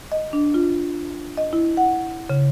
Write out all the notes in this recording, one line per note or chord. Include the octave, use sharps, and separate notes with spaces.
D#5
D4
F4
D#5
E4
F#5
C#3